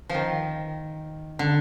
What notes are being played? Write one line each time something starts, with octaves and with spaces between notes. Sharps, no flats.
D#3 F3
D3